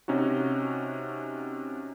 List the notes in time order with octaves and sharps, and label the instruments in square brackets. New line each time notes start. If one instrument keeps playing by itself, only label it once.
[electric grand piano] C3 C#4 D#4 F#4